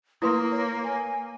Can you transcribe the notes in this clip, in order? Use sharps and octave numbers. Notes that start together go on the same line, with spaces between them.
A#3 E4 B4 C6 D#6
C#5
G#5